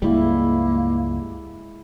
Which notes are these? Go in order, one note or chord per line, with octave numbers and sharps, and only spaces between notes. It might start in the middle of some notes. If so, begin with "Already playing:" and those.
C#2 G2 G3 G#3 A#3 E4